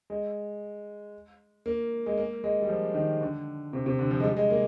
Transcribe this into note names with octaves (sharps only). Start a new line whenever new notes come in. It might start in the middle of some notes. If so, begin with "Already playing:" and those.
G#3
A#3
G#3
A#3
G#3
G3
F3
D#3
D3
C3
C3
D3
F3
G#3
G3
G#3
A#3